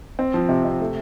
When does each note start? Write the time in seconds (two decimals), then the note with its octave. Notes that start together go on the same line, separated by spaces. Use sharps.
0.19 C4
0.34 F3
0.49 C3
0.65 C3
0.80 A3